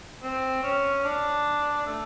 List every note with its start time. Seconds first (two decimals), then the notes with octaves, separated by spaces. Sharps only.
0.23 C4
0.63 C#4
1.04 D4
1.87 A3